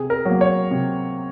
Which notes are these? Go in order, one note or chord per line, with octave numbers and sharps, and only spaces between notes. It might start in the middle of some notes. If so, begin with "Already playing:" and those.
Already playing: C3 G#4
A#4
F#3 A#3
C#5
C3